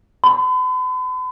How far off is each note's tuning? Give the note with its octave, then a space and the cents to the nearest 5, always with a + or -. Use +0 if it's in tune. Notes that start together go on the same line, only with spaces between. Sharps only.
B5 +45